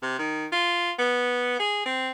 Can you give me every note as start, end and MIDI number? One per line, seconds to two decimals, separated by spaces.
0.02 0.18 48
0.19 0.46 51
0.52 0.91 65
0.99 1.57 59
1.60 1.85 68
1.86 2.11 60